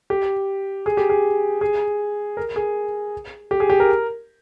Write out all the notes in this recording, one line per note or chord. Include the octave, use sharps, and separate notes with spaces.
G4
G#4
G4
G#4
G#4
A#4
G#4
G4
G#4
G4
A#4